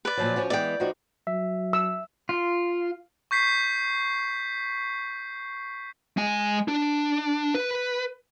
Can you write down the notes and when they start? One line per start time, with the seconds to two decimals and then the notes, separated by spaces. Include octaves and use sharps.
0.05 B4 D5
0.17 A#2 F3 F#3
0.36 F3 C#4 F#4
0.50 E3 G#3 B3 D5 G5
0.80 F3 D#4 F#4
1.27 F#3 E5
1.73 E6
2.29 F4
3.31 C#6 G6 B6 C7
6.17 G#3 G#5
6.68 D4
7.55 B4